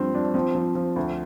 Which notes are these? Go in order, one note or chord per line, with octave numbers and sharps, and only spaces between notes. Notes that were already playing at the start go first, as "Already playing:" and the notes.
Already playing: G2 F3 C4
F3 D4
F3 C4
F3
F3
D2